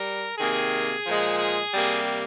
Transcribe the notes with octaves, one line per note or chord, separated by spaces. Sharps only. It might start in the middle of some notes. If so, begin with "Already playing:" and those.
Already playing: G3 A#4
C3 D#3 A#3 G#4
A#2 F3 G#3
G#4
C3 G3 A#3